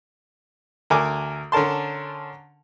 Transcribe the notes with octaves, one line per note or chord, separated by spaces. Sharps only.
D2 A#4 G#5 D6
D3 C#4 A#4 A5 C6